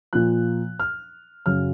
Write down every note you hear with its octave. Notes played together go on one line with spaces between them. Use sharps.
A#2 F3 F#6
F6
F#2 C#3 F#3 F6